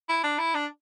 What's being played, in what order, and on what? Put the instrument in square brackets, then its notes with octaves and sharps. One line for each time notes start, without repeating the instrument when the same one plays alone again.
[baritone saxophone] E4
D4
E4
D4